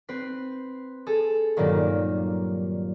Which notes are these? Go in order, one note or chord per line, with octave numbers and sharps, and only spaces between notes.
C4 B4 C7
G#4 A4
G2 A#2 D#3 F#3 A#3